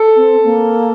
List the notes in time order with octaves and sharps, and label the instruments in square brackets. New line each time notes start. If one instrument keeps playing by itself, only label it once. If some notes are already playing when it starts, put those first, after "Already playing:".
Already playing: [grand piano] A4
[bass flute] C4
A#3